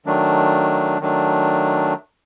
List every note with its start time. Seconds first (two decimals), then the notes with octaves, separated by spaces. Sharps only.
0.06 D#3 F#3 A3 D4
1.00 D#3 F#3 A3 D4